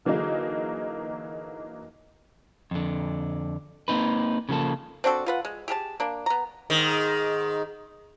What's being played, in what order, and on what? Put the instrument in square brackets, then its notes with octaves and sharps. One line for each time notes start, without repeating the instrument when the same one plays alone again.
[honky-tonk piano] D3 E3 F#3 A#3 D#4 G#4
[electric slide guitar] F2 D3
A#3 C4 D#4 B4
C#3 F3 A#3 A4
[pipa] C4 D4 F#4 A4
F4 B4 F#5
G#3
G4 G#4 A#4 A5
A#3 D4
B3 A#5
[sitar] G#2 D#3